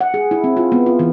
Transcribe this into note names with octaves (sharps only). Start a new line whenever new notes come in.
F#5
G#4
E4
C4
F4
B3
F4
E3